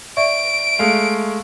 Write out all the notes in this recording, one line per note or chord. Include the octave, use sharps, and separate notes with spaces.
D5 E5 C#6 D7
G#3 A3 F5